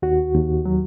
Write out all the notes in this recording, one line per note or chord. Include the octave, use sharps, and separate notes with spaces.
D#2 F#4
D#2
F#3